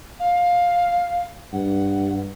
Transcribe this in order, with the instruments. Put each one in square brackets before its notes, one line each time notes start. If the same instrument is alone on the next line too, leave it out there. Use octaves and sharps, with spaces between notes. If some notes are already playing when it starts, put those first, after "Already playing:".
[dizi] F5
[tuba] G2 [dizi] F#5